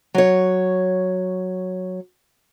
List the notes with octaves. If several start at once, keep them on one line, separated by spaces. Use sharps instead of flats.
F#3 C#5